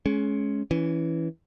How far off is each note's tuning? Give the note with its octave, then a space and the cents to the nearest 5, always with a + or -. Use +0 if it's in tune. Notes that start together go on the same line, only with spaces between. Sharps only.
G#3 +25 C#4 +0
E3 +0 C#4 +20